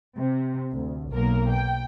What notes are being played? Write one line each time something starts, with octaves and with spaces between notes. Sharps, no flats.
C3
D2
B1 A#3 A#4
G5